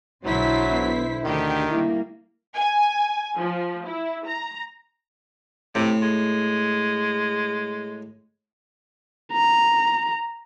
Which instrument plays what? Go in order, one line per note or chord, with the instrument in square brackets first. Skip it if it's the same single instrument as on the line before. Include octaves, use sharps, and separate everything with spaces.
[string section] B1 B6 [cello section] D3 E4 C5 [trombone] F#3
[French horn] B3
[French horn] D2 [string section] D3 G4 [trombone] D#3
[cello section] G3 A#3 [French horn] E4
[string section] G#5
F3
E4
A#5
[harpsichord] A2 [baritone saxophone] C3
[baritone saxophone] G#3
[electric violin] A#5